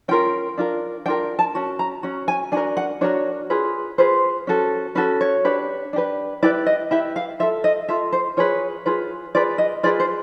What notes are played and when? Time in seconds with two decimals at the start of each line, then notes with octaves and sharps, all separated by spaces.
0.08 C#4 F4 A#4 G5
0.57 D4 F4 A#4
1.06 D4 F4 A#4 G5
1.39 A5
1.55 C#4 F#4
1.79 A#5
2.03 C#4 F#4
2.28 G#5
2.52 D4 F#4 A#4 G#5
2.77 F#5
3.01 D4 F#4 A#4 C#5
3.50 F4 G#4 B4
3.98 F4 G#4 B4 C5
4.47 C#4 F#4 A4
4.95 C#4 F#4 A4 B4
5.21 C#5
5.45 D4 G4 B4
5.93 D4 G4 B4
6.43 E4 G4 B4 D5
6.66 D#5
6.91 E4 G4 B4 E5
7.16 F5
7.39 F4 A4 E5
7.64 D#5
7.88 F4 A4 E5
8.13 C5
8.37 F4 G#4 B4 C#5
8.86 F4 G#4 B4
9.35 F4 G#4 B4 D5
9.58 D#5
9.83 F4 G#4 B4 D5
10.00 C5